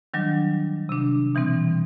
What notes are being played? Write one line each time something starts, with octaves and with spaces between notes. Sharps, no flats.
D#3 F#3 G3 D4
C3 D4
B2 E3 G3 C4